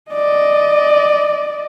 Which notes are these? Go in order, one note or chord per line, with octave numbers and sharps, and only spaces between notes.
D5 D#5